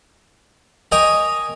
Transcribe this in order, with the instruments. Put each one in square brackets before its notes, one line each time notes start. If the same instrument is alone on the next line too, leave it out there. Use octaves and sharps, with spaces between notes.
[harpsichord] A#4 C#5 D#5 G5 G#5 A#5